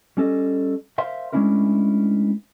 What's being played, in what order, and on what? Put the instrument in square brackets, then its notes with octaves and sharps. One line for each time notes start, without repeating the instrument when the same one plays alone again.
[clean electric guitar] G3 C#4 A4 D#5
A#4 C5 E5 F5 C6
G#3 A3 C#4 D4 E4 A#4